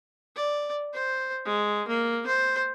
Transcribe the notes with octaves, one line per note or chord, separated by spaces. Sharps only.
D5
C5
G#3
A#3
C5